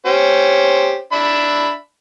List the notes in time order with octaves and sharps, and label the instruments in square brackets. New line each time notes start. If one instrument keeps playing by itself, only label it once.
[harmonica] C#4 G4 C5
D4 E5 B5